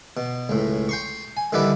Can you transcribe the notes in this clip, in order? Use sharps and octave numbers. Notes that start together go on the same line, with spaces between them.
B2
C#2 A2
G5 C6 C#6
G#5
D3 D#3 G3 E4 B4 D5